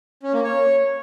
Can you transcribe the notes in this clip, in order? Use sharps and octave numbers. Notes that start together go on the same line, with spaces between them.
C#4
A#3
C#5